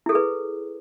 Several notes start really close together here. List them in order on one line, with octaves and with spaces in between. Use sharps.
E4 A4 G#4 B4